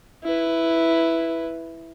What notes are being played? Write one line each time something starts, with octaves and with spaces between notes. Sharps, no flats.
E4 B4